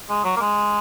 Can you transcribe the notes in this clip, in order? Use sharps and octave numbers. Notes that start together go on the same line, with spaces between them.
G#3
F#3
A#3
G#3